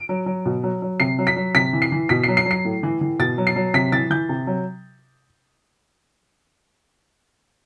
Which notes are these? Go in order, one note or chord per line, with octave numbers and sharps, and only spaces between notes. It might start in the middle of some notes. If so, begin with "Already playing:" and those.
Already playing: D7
F#3
F#3
B2
F#3
F#3
C3 C7
F#3
B6
F#3
C3 B6
E3
C7
E3
B2 B6
C7
F#3
C7
F#3
C7
A2
E3
E3
B2 A6
F#3
C7
F#3
C3 B6
E3 A6
E3 G6
C3
F#3